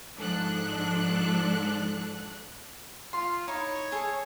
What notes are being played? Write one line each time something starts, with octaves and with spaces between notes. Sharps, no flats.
G#2 F3 D4 A4 F#6
F4 C6
D#4 E4 C#5
G#4 A4